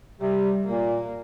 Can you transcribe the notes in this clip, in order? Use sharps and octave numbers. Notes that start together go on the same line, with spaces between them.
C3 G3
A#2 A#3